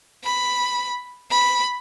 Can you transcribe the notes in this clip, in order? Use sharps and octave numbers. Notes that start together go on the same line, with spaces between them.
B5
B5